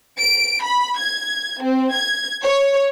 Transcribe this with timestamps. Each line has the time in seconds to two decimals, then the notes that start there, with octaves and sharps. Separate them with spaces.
0.18 D7
0.63 B5
0.98 G#6
1.62 C4
1.93 G#6
2.43 C#5